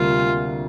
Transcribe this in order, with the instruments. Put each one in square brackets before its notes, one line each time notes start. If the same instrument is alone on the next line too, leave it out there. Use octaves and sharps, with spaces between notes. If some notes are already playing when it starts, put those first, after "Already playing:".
Already playing: [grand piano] D2 C3 G3 A#3 D4 [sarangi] F4